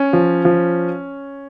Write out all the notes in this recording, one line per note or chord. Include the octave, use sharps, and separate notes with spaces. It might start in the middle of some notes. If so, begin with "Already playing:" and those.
Already playing: C#4
F3
F3